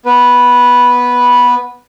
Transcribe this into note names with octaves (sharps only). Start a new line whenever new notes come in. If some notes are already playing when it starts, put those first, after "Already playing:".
B3 B4